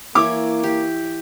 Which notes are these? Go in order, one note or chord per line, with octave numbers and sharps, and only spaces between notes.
E3 A#3 E4 C#5 D6
G4